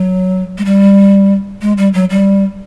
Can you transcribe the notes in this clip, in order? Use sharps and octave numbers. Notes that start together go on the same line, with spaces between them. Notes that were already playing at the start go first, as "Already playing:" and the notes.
Already playing: F#3
G#3
G3
G#3
G3
F#3
G3